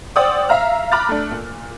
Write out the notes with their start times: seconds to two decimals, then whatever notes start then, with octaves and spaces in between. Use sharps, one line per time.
0.16 C5 D5 F#5 G5 D#6 E6
0.49 E5 F5 A#5 F6
0.92 A#5 B5 D6 F6 F#6 A6
1.09 A3 D4
1.31 A#2